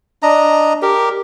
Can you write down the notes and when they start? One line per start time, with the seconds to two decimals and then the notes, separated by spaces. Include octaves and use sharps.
0.23 D4 D#5 A#5
0.82 G4 A#4